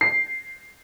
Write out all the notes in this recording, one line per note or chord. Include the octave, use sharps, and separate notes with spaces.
C7